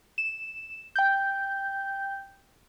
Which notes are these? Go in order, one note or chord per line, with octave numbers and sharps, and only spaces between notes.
E7
G5 G6